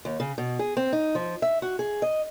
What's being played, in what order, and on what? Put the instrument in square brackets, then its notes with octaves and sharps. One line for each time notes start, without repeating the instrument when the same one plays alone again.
[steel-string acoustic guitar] D#2
C#3
B2
G#4
C4
D#4
F3
E5
F#4
G#4
D#5